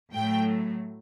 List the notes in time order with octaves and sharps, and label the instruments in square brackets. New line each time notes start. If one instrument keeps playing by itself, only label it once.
[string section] A2 F#3 A3 G5